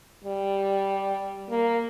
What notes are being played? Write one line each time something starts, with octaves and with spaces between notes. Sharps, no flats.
G3
A#3